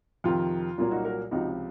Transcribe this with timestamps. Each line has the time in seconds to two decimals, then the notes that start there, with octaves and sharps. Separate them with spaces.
0.24 F2 C3 D#3 F4
0.78 C2 A#2 F#3 A#3 F4
0.91 D#4 F#4
1.05 F#4 A#4
1.31 C#2 C3 F3 D#4 F#4